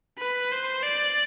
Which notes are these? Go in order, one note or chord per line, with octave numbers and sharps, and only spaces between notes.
B4
C5
D5